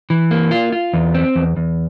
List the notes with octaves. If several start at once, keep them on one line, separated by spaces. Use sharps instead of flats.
E3
A#3
F4
F4
E2
C4
E2
E2